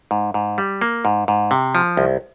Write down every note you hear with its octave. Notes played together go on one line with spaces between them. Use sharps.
G#2
G#2
G3
A#3
G#2
G#2
C3
F3
C2